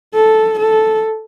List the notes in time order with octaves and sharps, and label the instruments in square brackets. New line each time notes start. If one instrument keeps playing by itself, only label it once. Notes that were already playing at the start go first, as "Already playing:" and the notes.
[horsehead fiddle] A4
A4